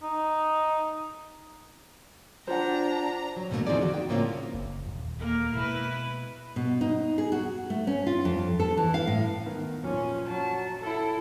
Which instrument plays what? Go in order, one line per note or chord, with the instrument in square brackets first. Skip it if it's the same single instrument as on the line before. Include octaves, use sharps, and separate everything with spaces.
[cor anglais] D#4
[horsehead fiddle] D4 [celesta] F4 G5 [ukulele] C5 F#5 [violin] A#5
[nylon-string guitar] F#3
F2 B2 D3 F#3 A3 A#3
D#3 F3 C4 D#4 G#4 D5
F#4
G5
A2 C#3 A#3 C4 C#4 F4
[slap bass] F#1 F2
D#1 E2
[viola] A#3 A#4
[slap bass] B2 G#3 A#3 [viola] E4 B4
[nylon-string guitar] B2
D#4
G#4
F#4
A3
C#4
F4
F2
A4
E3
F5
A2
[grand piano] D#3 B3 A#4
[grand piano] F#2 A#2 F3 [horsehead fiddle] C#4
[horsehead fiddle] F#3 A5
E4 A4